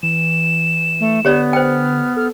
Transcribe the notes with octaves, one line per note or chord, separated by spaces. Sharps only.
E3 E7
A3
D3 B3 G4 C#5 D5
C5 G5 F6
A4 F6